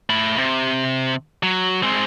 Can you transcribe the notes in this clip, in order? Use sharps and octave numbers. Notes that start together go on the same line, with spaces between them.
A3 B5
C3
F#3
G#3 C4